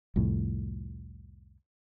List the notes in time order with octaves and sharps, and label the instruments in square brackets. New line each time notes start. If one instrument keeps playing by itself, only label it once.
[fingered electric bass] C2 F2 A2